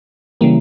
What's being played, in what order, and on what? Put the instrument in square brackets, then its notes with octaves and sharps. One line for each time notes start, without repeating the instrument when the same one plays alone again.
[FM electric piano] C#3 E3 G3 A#3